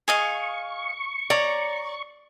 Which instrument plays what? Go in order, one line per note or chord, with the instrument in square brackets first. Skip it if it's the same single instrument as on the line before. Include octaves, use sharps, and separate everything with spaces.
[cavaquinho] G#4 D#5 F5 [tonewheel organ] C#6
[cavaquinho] C#5 A#5 [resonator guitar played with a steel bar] D5